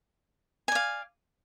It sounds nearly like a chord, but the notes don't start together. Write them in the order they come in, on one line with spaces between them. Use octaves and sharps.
G#5 D5 F5